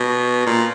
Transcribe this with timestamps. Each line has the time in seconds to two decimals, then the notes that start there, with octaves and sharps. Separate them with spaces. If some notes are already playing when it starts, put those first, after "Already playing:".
Already playing: B2
0.46 A#2